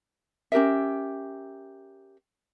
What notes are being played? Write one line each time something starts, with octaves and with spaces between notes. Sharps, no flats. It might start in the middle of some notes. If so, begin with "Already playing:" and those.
C#4 G4 A#4 E5